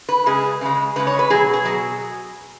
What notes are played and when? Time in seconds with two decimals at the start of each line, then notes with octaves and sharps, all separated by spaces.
0.09 B4
0.26 C#3 G#3 G#4
0.61 C#3 G#3
0.96 C#3 G#3 B4
1.07 C#5
1.19 B4
1.30 B2 F#3 G#4
1.53 G#4
1.65 B2 F#3